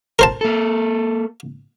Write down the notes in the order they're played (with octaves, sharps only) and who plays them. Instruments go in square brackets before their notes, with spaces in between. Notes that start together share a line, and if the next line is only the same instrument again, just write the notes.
[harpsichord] A#4 C5 A5
[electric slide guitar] A#3 A4